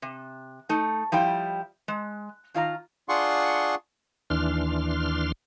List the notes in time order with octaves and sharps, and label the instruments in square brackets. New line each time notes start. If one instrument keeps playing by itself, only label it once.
[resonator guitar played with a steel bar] C3
A3 D#4
F3 G3 E4 G5
G#3
D#3 F4 D5 A#5
[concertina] D4 F4 G#4 F#5 C6 C#6
[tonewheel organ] D#2 E3 D4 C6 F6